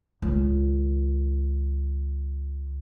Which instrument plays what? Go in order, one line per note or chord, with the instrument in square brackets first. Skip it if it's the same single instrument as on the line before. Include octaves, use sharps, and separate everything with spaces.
[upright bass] C#2 D#3